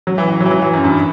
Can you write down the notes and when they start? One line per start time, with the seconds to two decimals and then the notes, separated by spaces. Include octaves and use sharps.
0.07 F#3
0.18 E3
0.29 E3
0.40 F#3
0.46 E3
0.51 F#3
0.62 E3
0.74 F#2
0.84 G2